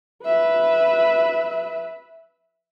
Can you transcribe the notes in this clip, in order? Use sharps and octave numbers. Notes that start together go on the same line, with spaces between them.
B4 E5